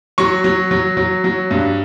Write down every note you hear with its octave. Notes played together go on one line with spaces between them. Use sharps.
F#3 C#6
F#3
F#3
F#3
F#3
G2